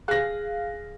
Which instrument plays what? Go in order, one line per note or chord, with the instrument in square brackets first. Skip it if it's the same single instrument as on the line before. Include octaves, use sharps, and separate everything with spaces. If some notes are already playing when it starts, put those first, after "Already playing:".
[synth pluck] G#4 F5 [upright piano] F#6 A#6